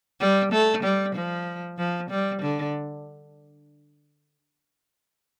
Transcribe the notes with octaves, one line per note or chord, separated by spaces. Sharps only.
G3
A3
G3
F3
F3
G3
D3